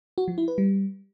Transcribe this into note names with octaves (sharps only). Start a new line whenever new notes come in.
F#4
F3
E4
B4
G3